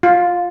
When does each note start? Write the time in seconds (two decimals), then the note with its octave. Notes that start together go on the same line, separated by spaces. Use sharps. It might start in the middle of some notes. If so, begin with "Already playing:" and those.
0.03 F4